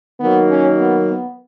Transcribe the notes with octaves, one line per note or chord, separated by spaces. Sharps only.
D#3 F#3 A#3 B3
C#4
B3
B3